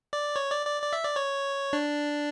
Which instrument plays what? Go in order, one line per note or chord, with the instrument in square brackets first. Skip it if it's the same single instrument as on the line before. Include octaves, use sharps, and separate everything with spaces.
[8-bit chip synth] D5
C#5
D5
D5
D5
E5
D5
C#5
D4